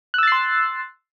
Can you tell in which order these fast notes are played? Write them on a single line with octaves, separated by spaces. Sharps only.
F#6 E6 A6 C7 C6